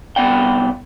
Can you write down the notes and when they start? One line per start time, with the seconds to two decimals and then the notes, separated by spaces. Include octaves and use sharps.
0.16 C2 F#3 B3 D5 F#5 G5